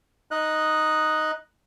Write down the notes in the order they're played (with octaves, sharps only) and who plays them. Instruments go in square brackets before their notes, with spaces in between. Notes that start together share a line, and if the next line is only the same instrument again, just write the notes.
[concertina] D#4 D#5 F#6